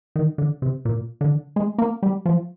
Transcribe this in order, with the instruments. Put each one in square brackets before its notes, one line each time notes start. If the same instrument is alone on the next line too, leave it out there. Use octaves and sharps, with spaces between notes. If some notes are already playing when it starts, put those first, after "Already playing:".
[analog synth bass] D#3
D3
C3
A#2
D3
G#3
A#3
G3
F3